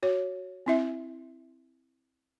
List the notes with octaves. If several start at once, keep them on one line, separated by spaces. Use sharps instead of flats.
F#4 C#5
C4 E4 E5